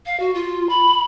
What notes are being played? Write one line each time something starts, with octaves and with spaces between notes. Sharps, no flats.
F5
F#4
F4
B5